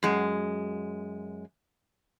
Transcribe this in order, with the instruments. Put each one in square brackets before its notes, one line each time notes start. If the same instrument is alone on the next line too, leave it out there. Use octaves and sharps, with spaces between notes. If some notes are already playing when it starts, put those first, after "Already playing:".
[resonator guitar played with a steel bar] F#2 G#3